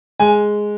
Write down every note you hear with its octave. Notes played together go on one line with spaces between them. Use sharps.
G#3 G#5